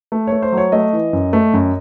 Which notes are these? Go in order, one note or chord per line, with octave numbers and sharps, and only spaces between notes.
A3
A3 C#5
C5
F#3
C#5
A3 D#5
E3
F#2
A3
F#2